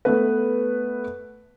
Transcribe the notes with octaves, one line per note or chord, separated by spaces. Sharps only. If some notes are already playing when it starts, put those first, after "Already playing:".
A3 B3 B4